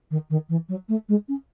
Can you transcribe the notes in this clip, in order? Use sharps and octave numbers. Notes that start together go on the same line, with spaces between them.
D#3
D#3
E3
F#3
A3
G#3
C#4